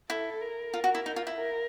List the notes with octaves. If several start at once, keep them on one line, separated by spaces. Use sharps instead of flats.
E4 A4
A#4
F4
F#4
E4
D#4
F4
E4
A#4